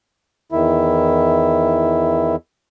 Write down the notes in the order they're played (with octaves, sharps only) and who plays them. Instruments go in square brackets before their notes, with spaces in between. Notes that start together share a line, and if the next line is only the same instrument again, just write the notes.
[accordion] E2 D#3 E4